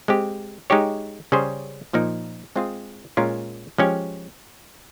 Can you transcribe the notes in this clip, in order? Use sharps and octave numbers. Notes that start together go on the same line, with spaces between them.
G#3 C4 G4
G#3 D#4 G4 C#5
C#3 G3 C#4 G#4 C5
A#2 F3 A#3 D#4 A#4
G#3 C4 F4 G#4
A#2 G#3 C#4 F4 A#4
F3 G#3 C#4 G4 C#5